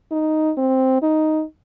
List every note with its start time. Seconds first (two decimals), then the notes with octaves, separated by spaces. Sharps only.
0.12 D#4
0.58 C4
1.03 D#4